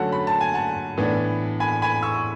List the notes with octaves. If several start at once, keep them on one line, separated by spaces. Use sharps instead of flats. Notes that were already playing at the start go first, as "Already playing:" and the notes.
Already playing: D3 F#3 A3 C#4 F#5 A5
B5
A5
G#5
F#5 A5
A2 E3 B3 D4
G#5 B5
G#5 B5
C#6 E6